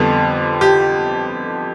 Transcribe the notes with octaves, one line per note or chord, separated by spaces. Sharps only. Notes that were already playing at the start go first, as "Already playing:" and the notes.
Already playing: F2 D3 G3 B3
G4